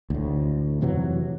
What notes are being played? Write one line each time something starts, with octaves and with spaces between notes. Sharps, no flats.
D2 A2
F2 C3 E3 F#3